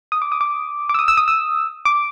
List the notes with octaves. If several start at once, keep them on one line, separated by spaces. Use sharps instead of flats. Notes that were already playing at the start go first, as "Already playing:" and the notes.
D#6
D6
D#6
D6
D6
E6
D#6
E6
D#6
E6
D6